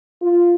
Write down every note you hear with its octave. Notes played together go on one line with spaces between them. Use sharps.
F4